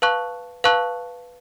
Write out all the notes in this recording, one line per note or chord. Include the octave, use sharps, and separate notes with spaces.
B4 F5 A5 C#6 F#6
B4 F5 A5 C#6 F#6